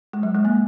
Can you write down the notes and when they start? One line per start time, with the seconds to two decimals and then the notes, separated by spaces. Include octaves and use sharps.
0.13 G#3
0.23 F#3
0.35 G#3
0.45 A#3